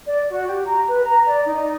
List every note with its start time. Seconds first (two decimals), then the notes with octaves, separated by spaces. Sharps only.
0.06 D5
0.28 F#4
0.46 G4
0.66 A#5
0.88 B4
1.04 A#5
1.27 D5
1.46 D#4